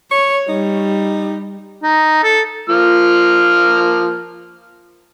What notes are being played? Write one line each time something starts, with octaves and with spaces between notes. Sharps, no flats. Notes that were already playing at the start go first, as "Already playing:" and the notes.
C#5 C#6
G3 D#4
D#4
A4
F3 A#3 F6